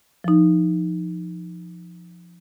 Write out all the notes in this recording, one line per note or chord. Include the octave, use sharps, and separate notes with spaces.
F3 D#4